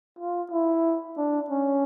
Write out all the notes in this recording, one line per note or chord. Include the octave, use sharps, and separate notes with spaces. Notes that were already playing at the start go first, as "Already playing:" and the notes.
F4
E4
D4
C#4